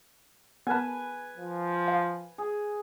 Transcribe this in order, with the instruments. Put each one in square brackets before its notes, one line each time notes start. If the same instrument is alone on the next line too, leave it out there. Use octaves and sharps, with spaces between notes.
[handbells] B3 A#4 A5 [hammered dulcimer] B4 G#5
[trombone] F3
[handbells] F5
[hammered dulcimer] G#4